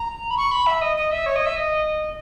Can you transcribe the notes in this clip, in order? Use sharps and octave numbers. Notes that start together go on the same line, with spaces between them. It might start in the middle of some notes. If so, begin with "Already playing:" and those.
Already playing: A#5
B5
C#6
B5
E5
D#5
D#5
E5
C#5
D#5
E5
D#5